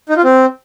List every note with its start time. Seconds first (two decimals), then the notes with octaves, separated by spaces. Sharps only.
0.09 D#4
0.17 F4
0.24 C4